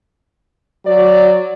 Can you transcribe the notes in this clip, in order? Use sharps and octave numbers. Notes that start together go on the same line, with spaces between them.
F#3 D5